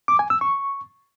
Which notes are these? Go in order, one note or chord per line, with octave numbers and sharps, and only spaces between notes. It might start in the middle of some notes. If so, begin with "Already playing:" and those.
D6
G#5
E6
C#6